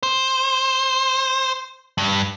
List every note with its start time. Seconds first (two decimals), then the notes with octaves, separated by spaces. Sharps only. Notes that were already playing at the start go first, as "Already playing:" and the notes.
0.03 C5
1.98 G2